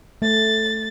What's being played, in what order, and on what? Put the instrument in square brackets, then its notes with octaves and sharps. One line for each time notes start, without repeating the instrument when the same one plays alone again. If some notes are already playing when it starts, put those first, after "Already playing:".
[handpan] A3 [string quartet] A6